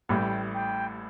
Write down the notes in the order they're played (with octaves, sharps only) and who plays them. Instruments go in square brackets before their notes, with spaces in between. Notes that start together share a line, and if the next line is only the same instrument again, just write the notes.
[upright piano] A1 A2 G3 [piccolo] G5
[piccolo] G5